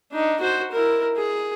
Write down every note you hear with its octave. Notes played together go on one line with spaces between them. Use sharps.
D4 D#4
F#4 C5
E4 A#4
G#4